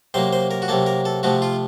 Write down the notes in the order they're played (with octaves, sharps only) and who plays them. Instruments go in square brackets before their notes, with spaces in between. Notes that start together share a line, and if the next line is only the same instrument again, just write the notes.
[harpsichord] C3 F#3 A#3 C5
C5
A#4
F#4
C3 F#3 A#3 A4
A#4
A4
C3 F3 A3 F#4
F4